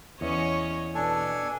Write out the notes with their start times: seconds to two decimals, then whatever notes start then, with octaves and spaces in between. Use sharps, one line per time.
0.21 E2 C#4 C#5 D#5
0.95 B2 D4 A4 G#5